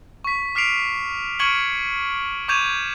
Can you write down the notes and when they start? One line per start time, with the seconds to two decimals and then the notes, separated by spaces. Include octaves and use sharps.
0.24 C#6 B6
0.55 D6 F6 B6 C7 D7 F7
1.39 C#6 F6 G#6 C#7 D7 F#7
2.48 C#6 D6 G6 G#6 D#7 F7